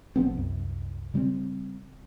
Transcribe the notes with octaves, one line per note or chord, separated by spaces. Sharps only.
A#1 F3 B3 C4
C2 F#2
C#3 G3 A#3 C4